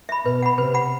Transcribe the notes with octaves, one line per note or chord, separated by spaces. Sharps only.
E5 B5
B2 B4
F#5 B5
C3 B4
F#5 B5